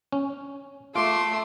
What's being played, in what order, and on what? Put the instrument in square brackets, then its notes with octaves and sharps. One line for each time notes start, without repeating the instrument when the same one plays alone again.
[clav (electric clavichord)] C#4
[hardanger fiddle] A3 [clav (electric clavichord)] F4 [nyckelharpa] C6 [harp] D6